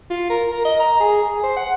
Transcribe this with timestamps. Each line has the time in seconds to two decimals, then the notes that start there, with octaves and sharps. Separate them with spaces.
0.10 F4
0.30 A#4
0.52 A#4
0.65 D#5
0.80 A#5
1.00 G#4
1.22 G#4
1.43 C5
1.56 F#5